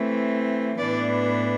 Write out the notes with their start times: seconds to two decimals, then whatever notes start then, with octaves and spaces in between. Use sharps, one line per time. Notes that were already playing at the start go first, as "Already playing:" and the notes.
Already playing: E3 A3 C4
0.78 A2 E3 B3 D4 D5